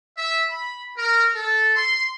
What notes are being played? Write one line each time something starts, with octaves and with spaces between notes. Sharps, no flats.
E5
B5
A#4
A4
C6